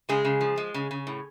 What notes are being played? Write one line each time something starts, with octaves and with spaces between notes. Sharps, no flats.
C#3 G#3 G#4
C#3
F3
G#3
C#3
C#3
A2